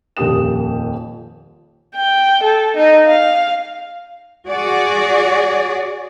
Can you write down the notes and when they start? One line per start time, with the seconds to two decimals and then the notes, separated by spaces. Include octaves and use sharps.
0.17 D#1 F2 A#2 G4 D#6 E7
1.95 G5
2.43 A4
2.76 D#4
3.08 F5
4.48 F#4 G#4 D5